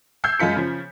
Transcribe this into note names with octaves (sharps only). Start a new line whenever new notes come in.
E6 G6 G#6 C7
F#2 G#3 F4 B6 C#7
C#3 F3